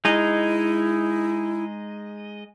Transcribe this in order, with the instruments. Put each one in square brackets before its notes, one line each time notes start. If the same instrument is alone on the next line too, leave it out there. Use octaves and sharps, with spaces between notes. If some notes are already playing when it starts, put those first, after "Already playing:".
[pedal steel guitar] G#3 D#4 D#5 [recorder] E4